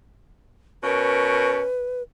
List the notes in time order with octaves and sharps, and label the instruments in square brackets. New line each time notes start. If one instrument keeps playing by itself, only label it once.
[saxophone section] B2 C#4 A#4 [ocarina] B4